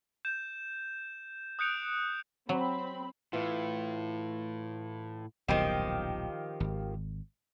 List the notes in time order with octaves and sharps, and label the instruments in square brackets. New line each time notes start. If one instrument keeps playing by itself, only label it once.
[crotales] G6 E7
D#6 F#6 G6 C#7 D7 F7
[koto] F#3 [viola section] C4 B5
[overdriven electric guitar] A2 [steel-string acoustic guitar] E3 F4
[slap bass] D#1 B1 A2 [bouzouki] D#3 F3 G4
[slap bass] G#1